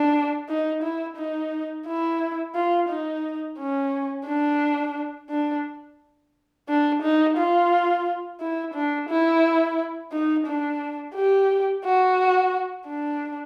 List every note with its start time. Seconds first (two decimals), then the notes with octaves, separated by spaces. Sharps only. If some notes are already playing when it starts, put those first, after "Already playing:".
Already playing: D4
0.49 D#4
0.83 E4
1.17 D#4
1.87 E4
2.55 F4
2.89 D#4
3.58 C#4
4.26 D4
5.30 D4
6.68 D4
7.02 D#4
7.37 F4
8.40 E4
8.74 D4
9.09 E4
10.13 D#4
10.47 D4
11.15 G4
11.85 F#4
12.88 D4